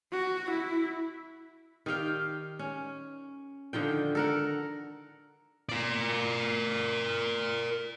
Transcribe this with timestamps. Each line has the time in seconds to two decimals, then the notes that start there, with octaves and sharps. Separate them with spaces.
0.13 F#4
0.51 E4
1.86 D#3 G4 F5 G5
2.59 C#4
3.73 D3 D#3 F3 G5
4.15 A4 A#4 F#5
5.69 A#4 D5